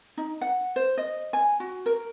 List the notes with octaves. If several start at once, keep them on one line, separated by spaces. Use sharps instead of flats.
D#4
F#5
C5
D#5
G#5
F#4
A#4